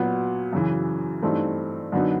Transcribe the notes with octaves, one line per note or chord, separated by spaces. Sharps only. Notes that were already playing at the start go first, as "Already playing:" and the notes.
Already playing: A#2 F#3 B3
F#2 C#3 E3
G2 E3 A3 C4 D#4
F#2 D3 F#3 B3 D#4